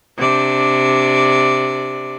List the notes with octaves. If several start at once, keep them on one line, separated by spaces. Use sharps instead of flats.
C3 D4 D5